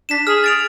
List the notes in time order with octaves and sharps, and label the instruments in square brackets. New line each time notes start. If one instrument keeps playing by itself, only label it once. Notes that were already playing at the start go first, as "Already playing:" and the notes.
[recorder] D4 [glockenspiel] B6 E7
[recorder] G#4 [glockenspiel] F6
[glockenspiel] A6 D7 F7